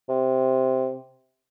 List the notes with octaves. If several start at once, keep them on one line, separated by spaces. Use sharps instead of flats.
C3